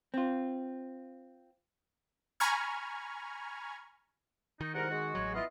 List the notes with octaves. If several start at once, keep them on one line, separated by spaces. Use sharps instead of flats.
C4 F4
G#5 A#5 B5 C#6 F6 G#6
D#3 D#4
C2 G#2 A#4 F#5
G#3 F#4
A1 F#3 C#5
B3 E4 F4 D#5